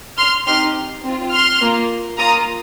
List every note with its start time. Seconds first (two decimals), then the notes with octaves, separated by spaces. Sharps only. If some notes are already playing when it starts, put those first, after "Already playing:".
0.18 C6 F6
0.46 C4 D#4 G4 C6 F6
1.04 C4 F4
1.32 C6 F6
1.61 A#3 F4
2.19 A#3 F4 A#5 D#6